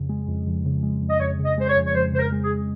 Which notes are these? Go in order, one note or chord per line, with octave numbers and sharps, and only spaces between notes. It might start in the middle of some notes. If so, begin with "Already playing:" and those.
Already playing: F2 C#3
G#3
F2
F2
C#3
G#3
F2
D#5
F2 C#5
C#3
D#5
G#3 C5
C#5
F2
C#5
F2 C5
C#3 C5
A#4
G#3
G#4